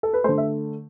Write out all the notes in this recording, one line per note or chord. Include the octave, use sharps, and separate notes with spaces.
A4
B4
D3 A3 C5
E5